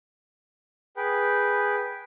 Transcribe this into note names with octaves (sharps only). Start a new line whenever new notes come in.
G#4 B4 G5